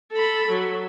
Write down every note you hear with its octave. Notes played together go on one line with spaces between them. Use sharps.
A4 B5
F#3